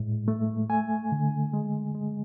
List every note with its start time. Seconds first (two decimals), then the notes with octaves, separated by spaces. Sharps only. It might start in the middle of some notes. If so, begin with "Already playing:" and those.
Already playing: A2 G#3
0.28 A3
0.70 A3 G#5
1.12 D3
1.53 G#3
1.95 G#3